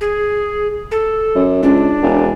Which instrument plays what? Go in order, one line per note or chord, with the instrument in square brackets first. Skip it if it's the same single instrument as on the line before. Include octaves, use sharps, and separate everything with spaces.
[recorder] G#4
A4
[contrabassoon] F#2
[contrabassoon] C#2 [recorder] D4
[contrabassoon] E1